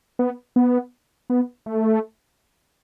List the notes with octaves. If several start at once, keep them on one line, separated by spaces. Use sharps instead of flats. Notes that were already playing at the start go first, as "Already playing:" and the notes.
B3
B3
B3
A3